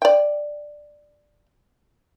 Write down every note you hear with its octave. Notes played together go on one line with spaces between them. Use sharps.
D5 G5